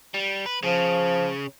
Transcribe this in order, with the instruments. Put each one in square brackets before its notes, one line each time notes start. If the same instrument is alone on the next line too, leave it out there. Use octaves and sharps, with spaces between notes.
[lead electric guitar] G3
B4
[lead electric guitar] C#3 [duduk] F3